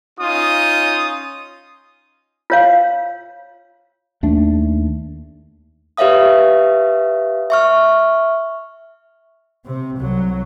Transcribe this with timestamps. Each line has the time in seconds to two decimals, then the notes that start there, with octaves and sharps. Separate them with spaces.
0.20 C#4 D#4 F4 D#6
2.50 F4 C#5 F5
4.23 D#2 A3 D4
5.97 G4 B4 C#5 E5 F5 D#6
7.50 E5 C#6 F6
9.66 C3 C4
9.97 C2 F#3